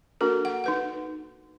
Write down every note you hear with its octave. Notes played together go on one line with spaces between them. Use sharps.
A#3 D4 F#4 A4 A#4
F#5
D#4 B4 F#5